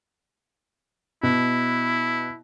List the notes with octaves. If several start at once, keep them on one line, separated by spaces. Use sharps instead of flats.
B2 E4